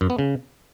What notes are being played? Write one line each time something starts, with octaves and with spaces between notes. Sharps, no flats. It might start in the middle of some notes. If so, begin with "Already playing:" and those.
F#2
B3
C#3